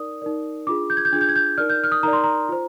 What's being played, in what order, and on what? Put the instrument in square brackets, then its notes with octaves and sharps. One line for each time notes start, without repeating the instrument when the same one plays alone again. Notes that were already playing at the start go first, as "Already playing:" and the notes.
Already playing: [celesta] D#4 A#4 D5 D#6
D#4 A#4 D5
D4 F4 G#4 D6
G6
G#6
G6
D4 F4 G#4 G#6
G6
G#6
G6
D#4 A#4 D5 F6
G6
F6
D#6
D#4 A#4 D5 A#5
C6
A#5
F4 C5